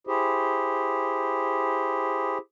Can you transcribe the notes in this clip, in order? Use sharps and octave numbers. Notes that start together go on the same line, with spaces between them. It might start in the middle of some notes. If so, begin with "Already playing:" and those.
E4 G4 G#4 C5